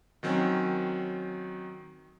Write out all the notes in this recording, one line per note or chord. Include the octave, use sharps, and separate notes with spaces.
D#3 F#3 C4 C#4